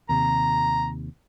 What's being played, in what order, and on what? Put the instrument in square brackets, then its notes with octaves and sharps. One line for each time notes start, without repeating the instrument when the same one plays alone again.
[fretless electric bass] D#2 C3 [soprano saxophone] A#5